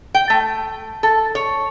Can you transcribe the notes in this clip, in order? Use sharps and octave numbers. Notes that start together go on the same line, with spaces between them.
G5
A3
A4
C#5